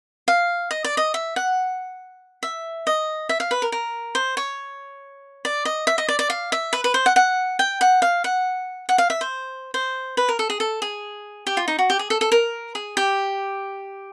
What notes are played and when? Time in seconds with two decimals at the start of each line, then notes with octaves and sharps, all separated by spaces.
0.28 F5
0.71 D#5
0.84 D5
0.97 D#5
1.14 E5
1.36 F#5
2.43 E5
2.87 D#5
3.29 E5
3.40 F5
3.51 B4
3.62 A#4
3.72 A#4
4.15 C5
4.37 C#5
5.45 D5
5.65 D#5
5.87 E5
5.98 D#5
6.09 D5
6.19 D5
6.30 F5
6.52 E5
6.73 B4
6.84 B4
6.94 C5
7.06 F#5
7.16 F#5
7.59 G5
7.81 F#5
8.02 F5
8.24 F#5
8.89 F#5
8.98 F5
9.10 E5
9.21 C5
9.74 C5
10.17 B4
10.29 A#4
10.39 A4
10.50 G#4
10.60 A4
10.82 G#4
11.47 G4
11.57 F4
11.68 D#4
11.79 F#4
11.90 G4
11.99 G#4
12.10 A4
12.21 A4
12.32 A#4
12.75 G#4
12.97 G4